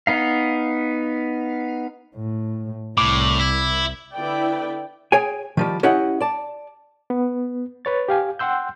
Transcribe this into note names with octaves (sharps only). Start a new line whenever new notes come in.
B3 D#4 F5
A2
C2 A2 D6
E4
D3 B3 E4 B4 D5 G5
G#4 C#5 G5 G#5
D#3 F3 G3
C#4 E4 G4 D#5 F#5
D5 A5
B3
B4 C#5 A6
G4 F5 G#5
F#5 G5 C6 E6 G6